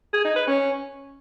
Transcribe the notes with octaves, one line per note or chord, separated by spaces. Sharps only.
G#4
D#4
B4
C#4